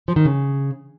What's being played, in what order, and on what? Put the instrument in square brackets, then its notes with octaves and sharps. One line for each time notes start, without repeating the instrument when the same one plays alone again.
[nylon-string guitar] F3
D#3
C#3